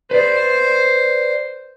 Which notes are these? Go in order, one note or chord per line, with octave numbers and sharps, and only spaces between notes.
B4 C5 D5